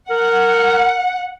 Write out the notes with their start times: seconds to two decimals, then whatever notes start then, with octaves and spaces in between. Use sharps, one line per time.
0.10 A#4 F#5